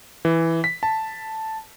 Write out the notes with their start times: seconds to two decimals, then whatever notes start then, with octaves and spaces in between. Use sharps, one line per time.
0.25 E3
0.64 B6
0.83 A5